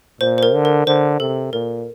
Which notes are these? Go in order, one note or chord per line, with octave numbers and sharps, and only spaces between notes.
A#2 C5
C5
A#4
D3
A#4
D3 C5
C3 A4
A#2 A#4